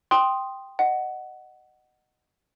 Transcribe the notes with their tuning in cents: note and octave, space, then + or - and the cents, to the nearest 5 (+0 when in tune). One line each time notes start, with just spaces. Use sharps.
G5 +0 C6 +0 D#6 +0
D#5 -20 F#5 +10